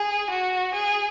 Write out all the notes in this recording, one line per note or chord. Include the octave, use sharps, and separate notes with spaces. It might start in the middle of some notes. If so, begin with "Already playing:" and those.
Already playing: G#4
F#4
G#4